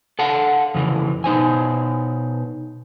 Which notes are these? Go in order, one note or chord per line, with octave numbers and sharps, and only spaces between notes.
A4 F5 F#5 A5
F2 C#3 E3
B2 D#4 C5 G#5